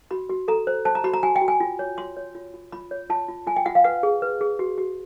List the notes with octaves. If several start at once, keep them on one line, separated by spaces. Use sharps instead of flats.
F#4 B5
F#4
A4 A#5
C5
C5 A5
A#5
F#4 B5
A#5
F#4 G#5
G5
F#4
G#5
F4
C#5
F4 C6
C#5
F4
F4
F4 B5
C#5
F4 A5
F4
F4 G#5
G5
F4 F#5
F5
B4 F#5
G#4
B4
G#4
F#4
F#4